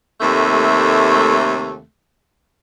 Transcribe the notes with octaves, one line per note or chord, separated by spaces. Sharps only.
D#2 C3 A3